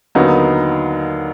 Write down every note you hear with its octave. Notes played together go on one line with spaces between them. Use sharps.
D#2 D3 F#3 B3 D#4